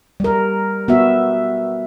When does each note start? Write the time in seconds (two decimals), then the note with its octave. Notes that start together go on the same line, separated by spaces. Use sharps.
0.20 G3 A#4
0.88 B3 F#4 E5